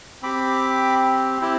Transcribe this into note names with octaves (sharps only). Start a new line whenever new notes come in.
C4 G4 B5 D6
C4 E4 G4